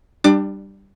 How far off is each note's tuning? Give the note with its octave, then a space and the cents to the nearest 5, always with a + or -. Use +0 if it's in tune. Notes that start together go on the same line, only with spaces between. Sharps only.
G3 +0 D4 +25 D6 +30